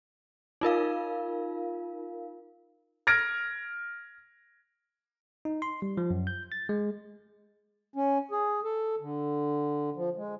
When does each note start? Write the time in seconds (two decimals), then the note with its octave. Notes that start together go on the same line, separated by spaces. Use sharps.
0.61 D#4 F4 A#4 F5
3.07 F6 G#6 A#6 D7
5.45 D#4
5.62 C6
5.82 G3
5.97 F3
6.10 F#2
6.27 G6
6.52 A6
6.69 G#3
7.96 C#4
8.31 G#4
8.64 A4
9.00 D3
9.96 F3
10.16 G#3